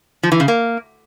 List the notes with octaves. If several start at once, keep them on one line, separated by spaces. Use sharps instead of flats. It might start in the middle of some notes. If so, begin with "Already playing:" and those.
F3
E3
C#3
A#3